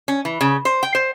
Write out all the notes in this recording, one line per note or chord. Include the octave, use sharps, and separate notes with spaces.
C#4
E3
C#3
C5
G5
C5